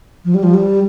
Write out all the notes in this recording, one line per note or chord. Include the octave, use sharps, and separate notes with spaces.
F3
G3
F3
G3